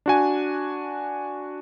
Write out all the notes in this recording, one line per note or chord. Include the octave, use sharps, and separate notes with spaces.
D4 F#4 G#5